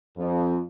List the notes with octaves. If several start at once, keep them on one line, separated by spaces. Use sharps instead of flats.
F2